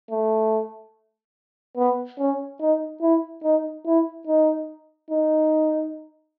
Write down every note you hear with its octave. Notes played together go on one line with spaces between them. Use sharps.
A3
B3
C#4
D#4
E4
D#4
E4
D#4
D#4